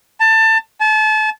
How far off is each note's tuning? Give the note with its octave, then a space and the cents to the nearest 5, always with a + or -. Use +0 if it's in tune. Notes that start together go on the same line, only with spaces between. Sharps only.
A5 +20
A5 -30